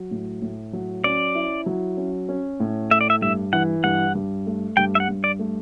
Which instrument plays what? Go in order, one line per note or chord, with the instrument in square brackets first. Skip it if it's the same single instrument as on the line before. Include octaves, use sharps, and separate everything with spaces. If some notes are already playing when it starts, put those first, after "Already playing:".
Already playing: [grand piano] F#3
A2
A2
F#3
[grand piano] C#4 [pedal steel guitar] D5
[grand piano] E4
F#3
C#4
C#4
A2
[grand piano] A3 [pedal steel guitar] E5
[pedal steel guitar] D5
E5
[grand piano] G2 [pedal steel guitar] E5
[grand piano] E3 [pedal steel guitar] F#5
[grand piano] G2 [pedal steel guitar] F#5
[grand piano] G2
A3
[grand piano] G2 [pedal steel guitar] G5
[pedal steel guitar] E5
F#5
[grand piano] G2
[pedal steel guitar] D5
[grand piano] A3